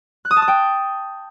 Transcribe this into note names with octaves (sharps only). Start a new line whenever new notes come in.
F#6
D#6
A5
D#6
G5